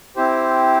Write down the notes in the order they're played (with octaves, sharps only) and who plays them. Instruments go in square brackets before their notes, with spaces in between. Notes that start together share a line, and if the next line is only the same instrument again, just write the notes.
[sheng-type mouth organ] C4 E4 G4 C5